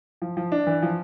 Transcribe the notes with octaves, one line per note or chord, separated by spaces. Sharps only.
F3
F3
D4
E3
F3